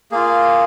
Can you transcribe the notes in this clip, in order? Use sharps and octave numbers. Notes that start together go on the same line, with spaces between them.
A#3 F4 G#4